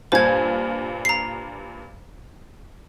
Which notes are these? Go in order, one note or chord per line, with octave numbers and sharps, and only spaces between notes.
G2 A#2 C5 G#5 G#6
A#5 C7